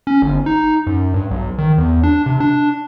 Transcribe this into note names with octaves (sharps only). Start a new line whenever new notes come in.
C#4
G1
D#4
F#2
G2
B1
D#3
E2
D4
C3
D4